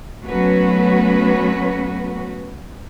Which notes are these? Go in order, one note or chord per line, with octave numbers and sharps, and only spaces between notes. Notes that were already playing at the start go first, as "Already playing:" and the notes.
F#3 A3 B3 C#4 F#4 B4